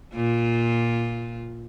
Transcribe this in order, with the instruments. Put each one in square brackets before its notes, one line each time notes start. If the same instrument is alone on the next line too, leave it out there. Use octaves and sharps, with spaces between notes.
[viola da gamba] A#2 F4